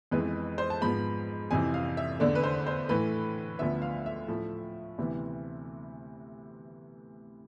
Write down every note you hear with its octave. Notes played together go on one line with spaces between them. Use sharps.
F2 E3 G#3 B3 B4
C5
A5
G#2 F3 B3 B5
F2 C3 E3 G#5
F5
E5
E2 D3 A3 D5
B4
C5
C5
A2 E3 A3 B4
D2 D3 F3 B3 E5
F5
E5
A2 F3 A3
D2 C3 E3 B3